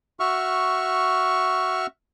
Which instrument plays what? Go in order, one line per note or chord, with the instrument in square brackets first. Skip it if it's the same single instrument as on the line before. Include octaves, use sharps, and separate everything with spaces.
[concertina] F#4 E5 C#6 F6